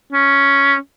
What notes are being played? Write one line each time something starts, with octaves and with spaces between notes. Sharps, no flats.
C#4